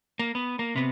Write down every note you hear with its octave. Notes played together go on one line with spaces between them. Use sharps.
A#3
B3
A#3
C3 B3